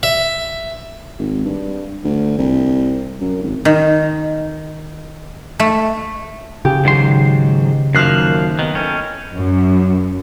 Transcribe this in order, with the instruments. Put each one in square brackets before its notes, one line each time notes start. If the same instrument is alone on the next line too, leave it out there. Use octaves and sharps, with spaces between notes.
[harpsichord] E5
[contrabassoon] G#1
G2
D2
C2
F#2
G#1
[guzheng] D#3
A3
[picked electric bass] C#3 [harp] G4
[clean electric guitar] G#2 C6 [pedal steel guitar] D#3 F#3
[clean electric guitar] F#2 F3 [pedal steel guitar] D#3 A#3 [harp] F6 F#6 C7
[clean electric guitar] D#3 [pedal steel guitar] B3
[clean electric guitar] C#4 [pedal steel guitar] E4 A4 G5
[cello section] F#2